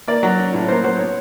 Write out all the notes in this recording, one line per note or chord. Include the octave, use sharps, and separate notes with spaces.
A#3 D5
F#3
C#4
A2 C#5
A#3 C5
F#3 C5
B3 C#5